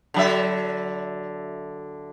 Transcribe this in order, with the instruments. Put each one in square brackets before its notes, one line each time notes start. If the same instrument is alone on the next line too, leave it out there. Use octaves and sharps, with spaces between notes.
[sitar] D3 F#3 E5